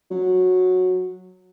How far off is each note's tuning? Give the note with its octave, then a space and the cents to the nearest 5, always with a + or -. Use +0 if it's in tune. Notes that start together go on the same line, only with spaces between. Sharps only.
F#3 -10